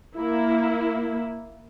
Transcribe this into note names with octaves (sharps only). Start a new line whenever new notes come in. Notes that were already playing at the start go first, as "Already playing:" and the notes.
A#3 E4